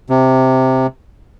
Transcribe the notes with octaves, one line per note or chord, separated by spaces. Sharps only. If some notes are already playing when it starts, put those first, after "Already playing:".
C3